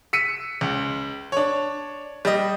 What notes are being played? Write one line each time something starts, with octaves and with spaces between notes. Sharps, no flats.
E6 B6 C#7 D#7
C#2
D4 C#5
G3 D#5